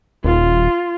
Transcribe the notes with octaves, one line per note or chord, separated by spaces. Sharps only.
D#1 F4